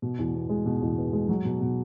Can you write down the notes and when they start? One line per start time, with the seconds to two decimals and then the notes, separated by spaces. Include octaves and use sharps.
0.02 B2
0.19 E2
0.34 B3
0.49 G#3
0.66 B2
0.82 E2
0.98 B3
1.13 G#3
1.29 F#3
1.45 B2
1.61 B2